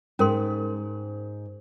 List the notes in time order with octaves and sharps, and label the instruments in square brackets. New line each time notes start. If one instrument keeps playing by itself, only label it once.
[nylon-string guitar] G#2 [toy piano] C#4 A#4 C6